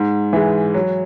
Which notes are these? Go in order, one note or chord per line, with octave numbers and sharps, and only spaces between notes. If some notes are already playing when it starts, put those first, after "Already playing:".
Already playing: G#2
E3 G#3
F#3